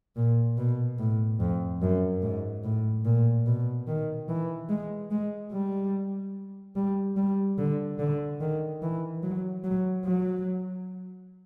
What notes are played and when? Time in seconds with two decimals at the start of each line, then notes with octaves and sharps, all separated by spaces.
0.16 A#2
0.58 B2
0.99 A2
1.40 F2
1.82 F#2
2.22 G#2
2.64 A2
3.05 A#2
3.46 B2
3.88 D#3
4.29 E3
4.69 G#3
5.11 G#3
5.52 G3
6.76 G3
7.17 G3
7.59 D3
7.99 D3
8.41 D#3
8.82 E3
9.23 F#3
9.64 F#3
10.05 F#3